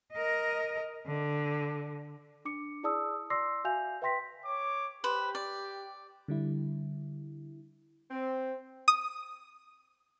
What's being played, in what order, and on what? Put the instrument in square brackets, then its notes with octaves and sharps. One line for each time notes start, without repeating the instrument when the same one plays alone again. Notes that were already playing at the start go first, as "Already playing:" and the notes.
[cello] A#4 D#5
D3
[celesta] D4 D6 C#7
E4 G#4 D5 A5 D#6 E6
D5 C6 D6 E6 A#6 C7
F#4 E5 F5 G#5 G6 F7
B4 E5 G5 C6 A#6 B6
[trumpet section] C#5 D6
[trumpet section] G4 [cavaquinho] B4 C5
[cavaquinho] D5
[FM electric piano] D3 G3 E4
[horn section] C4
[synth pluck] D#6